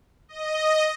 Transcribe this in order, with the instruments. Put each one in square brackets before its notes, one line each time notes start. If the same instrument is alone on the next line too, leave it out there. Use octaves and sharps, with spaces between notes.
[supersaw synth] D#5